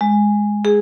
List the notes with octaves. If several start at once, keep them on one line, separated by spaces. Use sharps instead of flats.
G#3
G#4